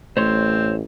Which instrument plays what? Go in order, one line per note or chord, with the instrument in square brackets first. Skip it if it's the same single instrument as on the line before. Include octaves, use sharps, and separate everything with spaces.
[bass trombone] A1 [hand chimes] A3 [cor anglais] C4 [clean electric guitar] C5 C#5 C6